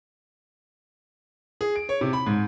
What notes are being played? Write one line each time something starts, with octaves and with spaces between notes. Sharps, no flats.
G#4
D7
C#5
C3
B5
G#2